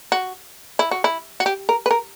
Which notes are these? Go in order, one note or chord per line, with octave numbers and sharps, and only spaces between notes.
F#4
E4
F#4
E4
F#4
G4
A#4
B4
A#4